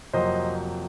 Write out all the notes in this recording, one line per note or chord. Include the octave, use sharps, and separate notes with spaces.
F2 C3 F#3 A#3 C5 D#5